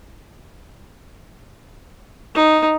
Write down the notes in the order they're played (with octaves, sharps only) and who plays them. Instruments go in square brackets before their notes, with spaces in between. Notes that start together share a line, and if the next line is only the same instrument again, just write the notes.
[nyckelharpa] D#4